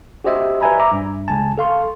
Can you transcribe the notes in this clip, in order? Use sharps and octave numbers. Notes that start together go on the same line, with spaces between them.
F#4 G4 C5 D#5 E5
B4 D5 E5 G#5 A#5 B5
E5 A#5 D6
G2
C#2 G#5 A5
A4 F5 C6 C#6